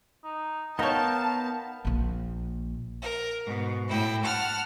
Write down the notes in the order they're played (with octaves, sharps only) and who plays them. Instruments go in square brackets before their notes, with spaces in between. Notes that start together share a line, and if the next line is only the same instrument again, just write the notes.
[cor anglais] D#4
[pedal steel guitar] B3 A#4 G5 [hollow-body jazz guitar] D#4 C#5 [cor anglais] F5 [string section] A5
[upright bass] A#1 A#3
[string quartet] A#4
G#2 B2
A2 E4 G5
F#5 A5 F6